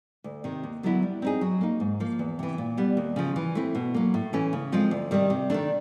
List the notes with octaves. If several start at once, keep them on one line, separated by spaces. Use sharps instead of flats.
D2
C3 D#3
D#2
D3 F#3 B3 E4
G3
C4 D#4 G#4
F#3
A#3 D#4
G#2
F3 A#3
E2
C3 E3
A#2
G3 B3
D#2
C#3 F3
E3
A3 C4 E4
B2
F#3 A#3
A2
E3 A3 C#4
C#3
F3 G#3 C4 F4
D2
C3 D#3 G3
C3
D#3 F#3 A3 D4